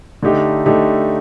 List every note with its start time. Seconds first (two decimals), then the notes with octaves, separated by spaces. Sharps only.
0.22 D3 A3 D#4 G4
0.66 D3 A3 D#4 G4